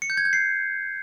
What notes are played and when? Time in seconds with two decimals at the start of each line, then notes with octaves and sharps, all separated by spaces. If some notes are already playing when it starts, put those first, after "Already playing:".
0.02 C#7
0.10 G6
0.17 G#6
0.25 G6
0.33 C7